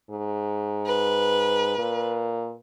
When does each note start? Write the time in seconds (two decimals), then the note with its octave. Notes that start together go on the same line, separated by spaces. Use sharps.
0.11 G#2
0.87 B4
1.79 A#2